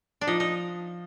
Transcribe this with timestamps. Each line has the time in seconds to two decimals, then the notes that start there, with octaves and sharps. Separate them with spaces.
0.21 D4
0.27 F3 D#4
0.40 D#4